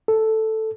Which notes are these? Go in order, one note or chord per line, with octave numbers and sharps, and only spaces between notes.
A4